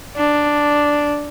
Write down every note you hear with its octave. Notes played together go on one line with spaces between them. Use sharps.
D4